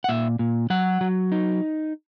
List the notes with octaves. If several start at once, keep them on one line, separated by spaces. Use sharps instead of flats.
F#5
A#2 E5
A#2
F#3 F#5
F#3
D#4